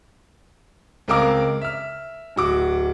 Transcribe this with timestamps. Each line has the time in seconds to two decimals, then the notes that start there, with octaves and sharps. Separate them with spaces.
1.08 C#2 C4 A#4 F5 D6
1.61 E5 F6
2.36 D1 F#4 D6